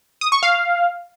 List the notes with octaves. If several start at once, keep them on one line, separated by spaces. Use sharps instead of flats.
D#6
C#6
F5